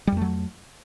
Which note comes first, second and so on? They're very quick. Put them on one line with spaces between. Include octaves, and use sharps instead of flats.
G3 F2 A3 F#3